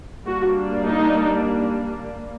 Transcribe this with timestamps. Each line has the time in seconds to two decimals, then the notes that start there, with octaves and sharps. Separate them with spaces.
0.24 G3 A#3 D4 F#4
0.88 D#4